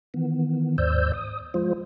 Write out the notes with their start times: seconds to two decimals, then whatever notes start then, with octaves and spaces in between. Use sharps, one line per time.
0.14 D#3 E3 B3
0.78 D#2 G#2 C5 D5 E6 G6
1.13 D#6
1.54 F3 G#3 F4 C5